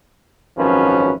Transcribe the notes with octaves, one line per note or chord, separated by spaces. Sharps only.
G#1 F#2 F3 C#4 B4